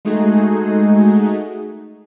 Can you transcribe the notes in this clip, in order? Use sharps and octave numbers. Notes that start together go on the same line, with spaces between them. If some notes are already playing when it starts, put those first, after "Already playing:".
G#3 A3 D#4 F#4 G#4